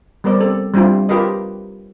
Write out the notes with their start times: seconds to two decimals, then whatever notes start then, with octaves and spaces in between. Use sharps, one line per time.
0.24 G3 B3 A#4 C5 D5
0.39 C4 A4
0.74 G3 C4 D4 E4 F4
1.09 F4 G4 A#4 B4 D#5